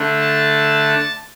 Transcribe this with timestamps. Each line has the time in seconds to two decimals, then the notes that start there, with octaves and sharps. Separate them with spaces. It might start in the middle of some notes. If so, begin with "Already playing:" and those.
Already playing: D3 A3 D4
0.21 A5